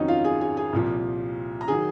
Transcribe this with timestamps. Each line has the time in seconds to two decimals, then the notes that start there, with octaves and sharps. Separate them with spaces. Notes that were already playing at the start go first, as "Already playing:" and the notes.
Already playing: F2 D#3 F#3 C#4 D#4 C#5 D#5
0.08 F4 F5
0.24 G#4 G#5
0.41 G#4 G#5
0.57 G#4 G#5
0.73 C2 A#2 F3
1.61 A#5
1.68 D#3 F#3 G#4 G#5